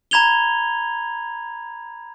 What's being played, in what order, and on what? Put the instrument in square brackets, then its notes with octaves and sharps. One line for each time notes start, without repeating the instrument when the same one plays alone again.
[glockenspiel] A#5 B5 G#6 F7 G7